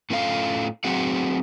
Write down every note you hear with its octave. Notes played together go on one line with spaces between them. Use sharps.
A2 C#4 F4 A4 C#5 F5
F#3 C4 F#4 G#4 F#5